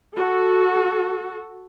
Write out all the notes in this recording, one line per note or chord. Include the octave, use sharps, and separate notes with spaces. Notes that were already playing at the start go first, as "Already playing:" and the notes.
F#4 A4